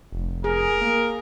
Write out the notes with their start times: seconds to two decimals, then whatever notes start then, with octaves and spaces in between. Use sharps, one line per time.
0.12 F1
0.44 G#4 A#4
0.81 A#3